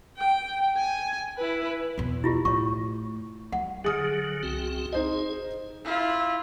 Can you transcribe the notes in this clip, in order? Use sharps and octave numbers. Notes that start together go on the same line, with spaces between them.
G5
G#5
E4 B4
E2 B2
E4 F4 G4
A2 C#5 C#6
G3 F#5
D3 F#3 G#4 D#6 F6
C2 C4 F#4
D#4 G#4 C5 D#5
E4 F4